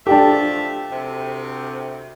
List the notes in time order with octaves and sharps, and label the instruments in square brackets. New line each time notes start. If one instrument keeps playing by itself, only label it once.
[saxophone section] F3 A3 E5 [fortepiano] D4 G4 [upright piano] A4 G5 A5
[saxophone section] D2 C3